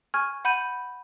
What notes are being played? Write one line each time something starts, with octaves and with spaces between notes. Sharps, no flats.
G#5 C#6 F6 G#6
F#5 B5 G6 D#7